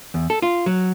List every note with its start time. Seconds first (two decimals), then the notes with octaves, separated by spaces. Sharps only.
0.14 E2
0.30 A4
0.42 F4
0.66 F#3